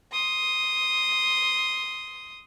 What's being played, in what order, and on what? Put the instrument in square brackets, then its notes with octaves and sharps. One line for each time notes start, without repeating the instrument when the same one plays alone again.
[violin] C6 D#6